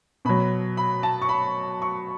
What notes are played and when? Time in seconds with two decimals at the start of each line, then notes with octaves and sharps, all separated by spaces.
0.25 B2 F#3 B5
0.77 B5
1.03 A5
1.22 C#6
1.29 B5
1.82 C#6